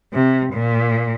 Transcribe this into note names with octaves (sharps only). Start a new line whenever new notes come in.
C3
A#2